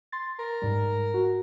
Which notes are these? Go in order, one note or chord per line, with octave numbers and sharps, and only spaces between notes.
C6 A6
A#4
G#2 G3
F#4